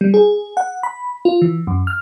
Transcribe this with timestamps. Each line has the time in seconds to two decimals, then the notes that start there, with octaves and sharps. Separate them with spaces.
0.01 G3
0.14 G#4
0.57 F#5
0.83 B5
1.25 F4
1.42 E3
1.67 F#2
1.87 F6